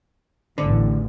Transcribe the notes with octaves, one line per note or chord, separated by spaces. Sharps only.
A1 E2 D3